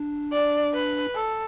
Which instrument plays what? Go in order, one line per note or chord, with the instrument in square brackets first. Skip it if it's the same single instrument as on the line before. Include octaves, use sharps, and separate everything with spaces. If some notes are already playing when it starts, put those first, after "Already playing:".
Already playing: [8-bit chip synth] D4
[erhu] D5
B4
A4